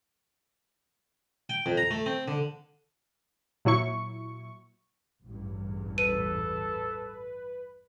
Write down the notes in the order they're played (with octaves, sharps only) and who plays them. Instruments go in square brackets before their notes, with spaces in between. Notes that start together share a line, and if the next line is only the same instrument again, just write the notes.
[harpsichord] G5
F2
A#5
A3
C4
D3
[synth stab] A#2 F#3 E4 C#6
[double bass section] A1 E2 G2
[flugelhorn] A4 [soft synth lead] B4 [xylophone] D#7